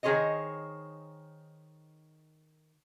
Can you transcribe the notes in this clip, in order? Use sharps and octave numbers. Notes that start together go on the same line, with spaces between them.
D#3 G#4 C5 C#5 D#5